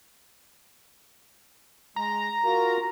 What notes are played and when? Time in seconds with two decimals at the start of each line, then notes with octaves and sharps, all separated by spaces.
1.96 G#3 A#5
2.44 F4 F#4 A#4